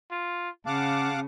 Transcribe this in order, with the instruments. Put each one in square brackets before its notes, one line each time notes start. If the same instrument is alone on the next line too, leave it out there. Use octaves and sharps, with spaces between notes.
[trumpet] F4
[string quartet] C#3 [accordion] F5 F#5 D6 [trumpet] A5